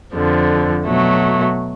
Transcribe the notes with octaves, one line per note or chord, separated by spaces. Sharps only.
F2 D3 F3
B2 F#3 A3